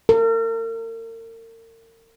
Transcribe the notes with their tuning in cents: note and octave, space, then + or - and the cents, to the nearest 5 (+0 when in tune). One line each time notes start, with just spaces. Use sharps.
A#4 -40